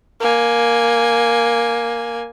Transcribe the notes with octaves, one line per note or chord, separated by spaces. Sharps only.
A#3 G#5